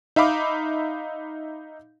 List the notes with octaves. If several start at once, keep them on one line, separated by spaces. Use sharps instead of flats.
D#4 E5 F5 B5 D6